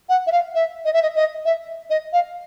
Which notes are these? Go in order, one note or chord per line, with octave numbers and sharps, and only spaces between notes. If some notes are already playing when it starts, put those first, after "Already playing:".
F#5
E5
F5
E5
D#5
E5
D#5
D#5
E5
D#5
F5